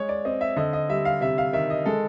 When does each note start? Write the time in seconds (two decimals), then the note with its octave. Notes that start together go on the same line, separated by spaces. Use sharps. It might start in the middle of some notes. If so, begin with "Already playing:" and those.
Already playing: G#3 C#5
0.09 D5
0.25 C4 D#5
0.41 E5
0.56 D3 D#5
0.73 D#5
0.89 G3 E5
1.05 F5
1.21 C3 E5
1.38 F5
1.53 D#3 E5
1.70 D#5
1.86 G#3 A4